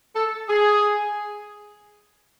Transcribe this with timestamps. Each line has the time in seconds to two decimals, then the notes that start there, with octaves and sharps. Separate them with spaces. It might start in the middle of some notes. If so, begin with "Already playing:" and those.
0.16 A4
0.49 G#4